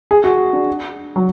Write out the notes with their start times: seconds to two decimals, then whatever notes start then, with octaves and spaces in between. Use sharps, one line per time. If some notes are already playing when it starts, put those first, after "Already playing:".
0.11 G#4
0.24 F#4
0.53 D4
1.16 F#3